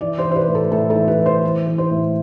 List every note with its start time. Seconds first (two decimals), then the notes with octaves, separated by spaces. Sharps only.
0.01 E3 D5
0.18 C5
0.25 E3
0.31 C5
0.36 B4
0.48 A2
0.55 A4
0.71 A2 A4
0.90 A4
0.95 E3
1.07 B4
1.20 E3
1.26 C5
1.43 E3
1.67 E3
1.78 C5
1.91 A2